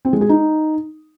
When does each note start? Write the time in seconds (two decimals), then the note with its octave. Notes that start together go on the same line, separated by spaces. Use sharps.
0.05 C4
0.13 G#3
0.21 G#4
0.29 D#4